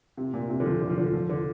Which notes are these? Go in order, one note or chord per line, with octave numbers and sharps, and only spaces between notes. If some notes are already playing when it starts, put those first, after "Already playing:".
C3
A#2
C3
D3
F3
D3
F3
D3
F3
D3